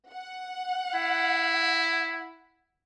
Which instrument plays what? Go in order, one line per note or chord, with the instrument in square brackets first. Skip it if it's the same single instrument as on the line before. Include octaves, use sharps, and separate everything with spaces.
[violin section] F#5
[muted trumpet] E4